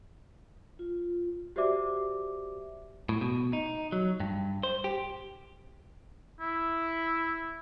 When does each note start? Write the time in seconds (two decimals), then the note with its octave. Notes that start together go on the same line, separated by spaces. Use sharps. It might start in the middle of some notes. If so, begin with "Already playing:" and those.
0.79 F4
1.56 F#4 G4 C5 D5 E5 D6
3.09 A2
3.21 B2
3.53 D#4
3.92 F#3
4.20 G2
4.63 C5
4.84 G4
6.41 E4